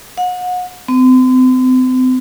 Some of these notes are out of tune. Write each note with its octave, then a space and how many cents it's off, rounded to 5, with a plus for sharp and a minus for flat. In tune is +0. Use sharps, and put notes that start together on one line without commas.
F#5 -35
C4 -40